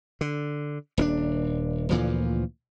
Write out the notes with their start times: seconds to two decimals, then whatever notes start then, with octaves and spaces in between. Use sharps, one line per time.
0.21 D3
0.98 D#1 C#4 D4
1.90 D2 A#2 E3 F3